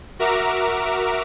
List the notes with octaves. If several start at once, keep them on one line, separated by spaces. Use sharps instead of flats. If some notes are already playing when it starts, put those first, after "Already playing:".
F#4 A#4 E5 A#5 D6